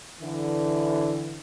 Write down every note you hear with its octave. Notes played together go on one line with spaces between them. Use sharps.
D3 E3